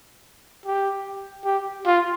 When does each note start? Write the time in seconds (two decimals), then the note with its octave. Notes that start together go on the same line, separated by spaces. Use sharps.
0.66 G4
1.45 G4
1.86 F4